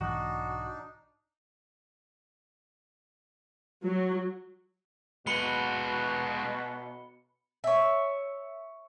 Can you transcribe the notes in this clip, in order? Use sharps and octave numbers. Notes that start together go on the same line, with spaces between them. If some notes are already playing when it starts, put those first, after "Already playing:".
B1 G#2 E3 D4 D#4 F#4
F#3
B2 G#3 F#4 B4 B5 C#7 G7
C#5 E5